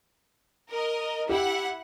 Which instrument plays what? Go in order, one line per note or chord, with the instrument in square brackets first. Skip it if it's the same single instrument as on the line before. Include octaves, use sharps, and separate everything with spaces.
[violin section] A#4 D#5
[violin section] E4 F#5 [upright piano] G4